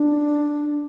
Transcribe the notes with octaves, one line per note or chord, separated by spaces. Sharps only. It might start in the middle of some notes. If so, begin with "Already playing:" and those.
Already playing: D4